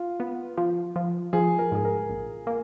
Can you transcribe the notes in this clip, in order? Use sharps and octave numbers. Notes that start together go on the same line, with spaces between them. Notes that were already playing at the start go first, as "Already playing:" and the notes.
Already playing: F4
B3
F3
F3
F3 G#4
A#4
G#2 G#4
A#4
A#1
A#3